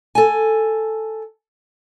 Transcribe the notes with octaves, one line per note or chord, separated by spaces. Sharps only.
A4 G#5